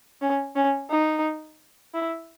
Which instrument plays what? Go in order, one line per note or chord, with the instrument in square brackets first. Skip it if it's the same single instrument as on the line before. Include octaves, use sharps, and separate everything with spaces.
[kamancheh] C#4
C#4
D#4
E4